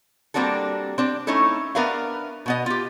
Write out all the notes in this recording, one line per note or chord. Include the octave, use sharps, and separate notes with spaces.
G3 A#3 C4 D4 F#4 A4
C4 D4
A3 C#4 D#4 E4 A4
B3 D4 A#4 B4 E5 F5
B2 B3 D#5
F4 G4